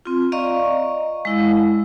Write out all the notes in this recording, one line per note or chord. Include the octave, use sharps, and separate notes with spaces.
C4 F4
D5 D#5 F5 A#5 C#6
G#3 E4 F5